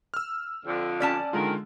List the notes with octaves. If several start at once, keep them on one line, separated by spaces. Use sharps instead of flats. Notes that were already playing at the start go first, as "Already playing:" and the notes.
E6 F6
F2 D3
G3 C#4 D5 A5
D3 D#3 G#3 F4 A#4